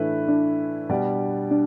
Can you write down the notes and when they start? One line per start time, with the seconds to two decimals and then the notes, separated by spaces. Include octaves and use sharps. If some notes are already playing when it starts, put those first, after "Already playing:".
Already playing: A2 E3 A3 D4 E4 B4
0.28 D4
0.89 B2 G3 B3 G4 D5
1.51 D4